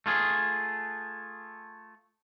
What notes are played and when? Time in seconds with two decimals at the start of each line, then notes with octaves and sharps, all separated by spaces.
0.06 A3 F4 G#4